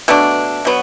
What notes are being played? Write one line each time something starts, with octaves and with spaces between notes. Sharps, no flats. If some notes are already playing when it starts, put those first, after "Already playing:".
B2 A3 D4
B2 F#3 B3